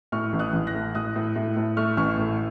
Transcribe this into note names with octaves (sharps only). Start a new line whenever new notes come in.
A2 C#6 F6
A1
D#6 F#6
A1
F#6 A#6
A3
A2 D#6 F#6
A2
A2
A2
A3 C#6 F6
A1 C#6 F6
A2